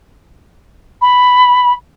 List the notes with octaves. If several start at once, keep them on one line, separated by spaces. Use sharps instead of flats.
B5